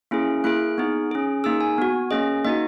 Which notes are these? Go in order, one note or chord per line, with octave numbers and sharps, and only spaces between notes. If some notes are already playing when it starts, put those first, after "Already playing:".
A#3 C#4 E4 G#4
A#3 E4 G#4 F#6
B3 D#4 G#4
C#4 G#4
A#3 D#4 G#4 E6
G#5
B3 F#4
A#3 C#4 G#4 D#5
A#3 D#4 F#4 D#5